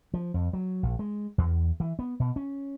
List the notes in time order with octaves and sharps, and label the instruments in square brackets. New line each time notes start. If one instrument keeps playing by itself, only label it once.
[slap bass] F3
F2
F#3
A#1
G#3
E2
E3
B3
B2
C#4